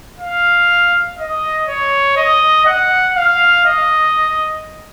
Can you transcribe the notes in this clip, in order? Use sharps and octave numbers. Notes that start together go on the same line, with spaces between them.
F5
D#5
C#5
D#5
F#5
F5
D#5